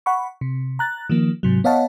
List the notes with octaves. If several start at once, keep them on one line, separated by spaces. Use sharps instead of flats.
F#5 B5 C#6
C3
A#5 F#6 A6
D#3 F3 A#3
G#2 C3 F#3
B3 C#5 D#5 F5 F#5 A5